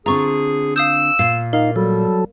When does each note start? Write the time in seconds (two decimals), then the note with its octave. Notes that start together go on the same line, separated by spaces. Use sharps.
0.06 D3 C4 F4 G#4 A#5 C#6
0.76 F5 D#6 E6 G6
1.19 A#2 F5 C7
1.53 D#4 A#4 F5
1.76 F#3 G3 A4